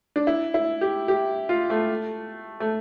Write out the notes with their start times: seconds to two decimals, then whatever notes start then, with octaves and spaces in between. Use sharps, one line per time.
0.16 D4
0.27 E4
0.54 E4
0.81 G4
1.08 G4
1.49 F4
1.70 A3
2.60 A3